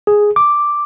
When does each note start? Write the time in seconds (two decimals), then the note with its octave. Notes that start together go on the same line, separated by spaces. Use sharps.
0.07 G#4
0.36 D6